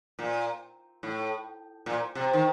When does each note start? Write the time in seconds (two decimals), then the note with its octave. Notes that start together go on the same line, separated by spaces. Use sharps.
0.19 A#2
1.03 A2
1.86 A#2
2.15 C3
2.33 D#3